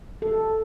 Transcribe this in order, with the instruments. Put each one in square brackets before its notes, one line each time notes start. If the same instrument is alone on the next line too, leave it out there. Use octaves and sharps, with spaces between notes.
[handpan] A4